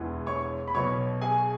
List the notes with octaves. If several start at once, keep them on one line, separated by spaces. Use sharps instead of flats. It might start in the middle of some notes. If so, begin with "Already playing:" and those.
Already playing: E1 E2 E3
C#5 C#6
B5
B1 B2 C#5 C#6
G#4 G#5